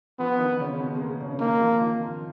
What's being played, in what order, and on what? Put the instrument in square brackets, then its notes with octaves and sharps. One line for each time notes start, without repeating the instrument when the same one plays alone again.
[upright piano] F3 F4 [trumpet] B3
[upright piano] D#3 D#4
C#3 C#4
B2 B3
G#3
A#3
C#3 C#4
C#4
[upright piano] D#3 D#4 [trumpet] A#3
[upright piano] F3 F4
D#3 D#4
F3 F4